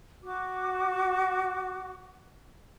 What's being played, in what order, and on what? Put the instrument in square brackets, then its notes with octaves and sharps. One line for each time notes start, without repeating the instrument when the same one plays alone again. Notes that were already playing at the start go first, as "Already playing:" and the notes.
[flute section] F#4 D6